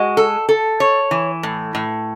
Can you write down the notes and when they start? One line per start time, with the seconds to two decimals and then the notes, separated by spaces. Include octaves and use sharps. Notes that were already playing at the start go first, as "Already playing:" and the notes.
Already playing: G#3 F#4
0.17 A4
0.49 A4
0.80 C#5
1.11 E3
1.43 A2
1.75 A2